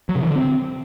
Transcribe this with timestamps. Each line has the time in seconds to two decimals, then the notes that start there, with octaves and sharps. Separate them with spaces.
0.09 F#3
0.16 C3
0.22 E3
0.29 D3
0.36 C4